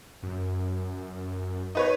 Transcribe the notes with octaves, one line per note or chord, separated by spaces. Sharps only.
F#2
D#4 B4 C#5